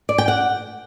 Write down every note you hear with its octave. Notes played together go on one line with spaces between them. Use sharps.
D5
G5
F#5